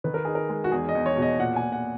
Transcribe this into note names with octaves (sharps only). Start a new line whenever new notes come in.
D#3 B4
A#4
D#4 G#4
A#4
G#3
F#4
E2 G#4
D#5
E2
C#5
B2
D#5
A#2 F#5
G#5
A#2
F#5